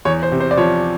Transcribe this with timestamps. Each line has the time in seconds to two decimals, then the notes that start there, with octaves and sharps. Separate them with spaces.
0.05 E2 C#5
0.23 C5
0.32 C3
0.40 C5
0.51 D5
0.57 F3 C#5